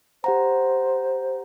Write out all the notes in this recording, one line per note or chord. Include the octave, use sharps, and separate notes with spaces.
G4 C5 F#5 A#5